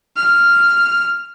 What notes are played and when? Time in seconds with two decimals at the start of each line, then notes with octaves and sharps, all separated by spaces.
0.16 F6